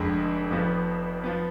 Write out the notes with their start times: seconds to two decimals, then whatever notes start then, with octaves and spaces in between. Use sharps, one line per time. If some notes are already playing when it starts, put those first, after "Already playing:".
Already playing: F1 F2 D3 G#3
0.50 F1 F2 F3 B3
1.24 F3 B3